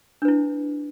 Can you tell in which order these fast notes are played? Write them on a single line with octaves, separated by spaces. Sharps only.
D4 B4 E4